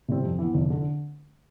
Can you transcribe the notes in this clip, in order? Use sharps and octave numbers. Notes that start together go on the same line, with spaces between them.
C3 G3 C4
F2
E3 B3
F1
D3